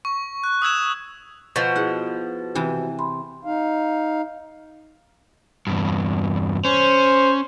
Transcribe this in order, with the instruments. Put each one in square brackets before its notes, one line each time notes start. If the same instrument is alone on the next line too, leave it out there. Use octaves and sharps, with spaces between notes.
[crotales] C#6
F#6
D#6 E6 G#6 E7
[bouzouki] B2 F3
[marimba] E4 G#4 [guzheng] F#5
[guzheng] C3 E3
[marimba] B5 C6
[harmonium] D#4 F5
[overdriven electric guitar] E2 G2
[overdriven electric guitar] C#4 [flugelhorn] C5